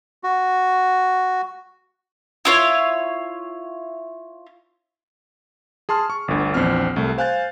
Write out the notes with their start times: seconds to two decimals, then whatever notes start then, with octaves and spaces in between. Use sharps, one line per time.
0.24 F#4
2.45 E4 F4 C#5
5.89 G#4 A5 C6 F6
6.10 C#6
6.28 G1 D2
6.54 A#1 E2 C4 F6
6.96 C2 A3
7.18 C5 F5 G#5 F#6 G6 A6